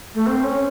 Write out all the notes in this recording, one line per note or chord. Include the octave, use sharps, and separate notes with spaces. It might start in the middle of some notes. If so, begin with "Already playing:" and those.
A3
C4
C#4